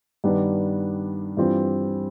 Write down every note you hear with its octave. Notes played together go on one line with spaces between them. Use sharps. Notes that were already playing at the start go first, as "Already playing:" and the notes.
G2 D#3 G3 B3 D4
G2 E3 G3 C4 F4